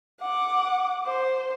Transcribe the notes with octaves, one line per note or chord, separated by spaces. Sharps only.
F#5 D6
C5